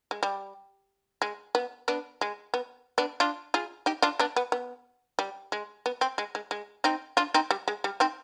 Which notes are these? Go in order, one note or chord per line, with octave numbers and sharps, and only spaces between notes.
G#3
G3
G#3
B3
B3 D4
G#3
B3
B3 D4
D4 F4
F4 G#4
D#4 G4
D4 F4
B3 D4
B3
B3
G3
G#3
B3
C4
G#3
G#3
G#3
C4 D#4
D4 F4
C4 D#4
G3
G#3
G3
C4 D#4